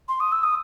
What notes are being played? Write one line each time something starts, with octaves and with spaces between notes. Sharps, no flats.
C6
D#6
E6
D#6